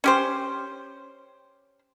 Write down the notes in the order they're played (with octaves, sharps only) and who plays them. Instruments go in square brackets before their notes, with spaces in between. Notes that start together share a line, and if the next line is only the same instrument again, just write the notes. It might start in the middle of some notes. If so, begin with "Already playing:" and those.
[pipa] C#4 G4 C5